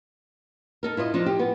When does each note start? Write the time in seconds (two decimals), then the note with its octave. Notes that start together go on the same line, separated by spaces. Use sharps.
0.83 D#4 A4 A#4
0.97 E4 F4 D5 D#5
1.14 F3 D4 D#4
1.26 G4
1.39 B3